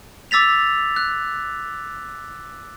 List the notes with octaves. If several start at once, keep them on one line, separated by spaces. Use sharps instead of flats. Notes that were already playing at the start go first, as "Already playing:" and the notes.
D6 E6 A6 B6 F7
F#6